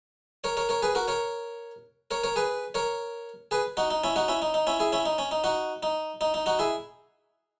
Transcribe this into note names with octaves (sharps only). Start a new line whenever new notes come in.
A#4 C#5
A#4 C#5
A#4 C#5
G#4 B4
F#4 A#4
A#4 C#5
A#4 C#5
A#4 C#5
G#4 B4
A#4 C#5
G#4 B4
D#4 F#4
D#4
C#4 E4
D#4 F#4
C#4 E4
D#4
D#4
C#4 E4
E4 G#4
C#4 E4
D#4
C#4
D#4
D#4 F#4
D#4
D#4
D#4
D#4 F#4
E4 G#4